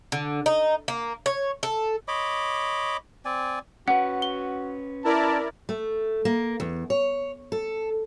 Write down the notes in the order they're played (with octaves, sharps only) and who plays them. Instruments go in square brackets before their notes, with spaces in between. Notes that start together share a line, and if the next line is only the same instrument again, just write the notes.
[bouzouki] D3
D#4
A#3
C#5
A4
[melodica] C#5 D#5 B5 D6
C4 D5 G#5
[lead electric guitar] C#4 B4 [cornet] F#4 [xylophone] F#5
[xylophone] G7
[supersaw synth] E4 A#4 D5 [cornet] A5
[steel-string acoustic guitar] A3
A#3
E2
C#5
A4